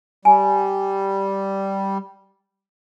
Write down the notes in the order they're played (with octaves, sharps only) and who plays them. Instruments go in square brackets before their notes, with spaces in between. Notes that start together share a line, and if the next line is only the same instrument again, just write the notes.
[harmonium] G3 [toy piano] G#5